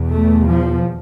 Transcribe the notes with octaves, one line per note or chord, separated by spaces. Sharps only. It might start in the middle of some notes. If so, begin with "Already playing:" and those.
Already playing: E2 B2
A3
F3